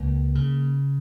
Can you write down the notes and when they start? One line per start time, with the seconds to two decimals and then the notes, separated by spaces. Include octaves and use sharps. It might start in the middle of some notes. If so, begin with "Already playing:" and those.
Already playing: C#2 A#3
0.35 C#3